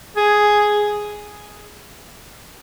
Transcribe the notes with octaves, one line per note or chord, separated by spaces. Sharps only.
G#4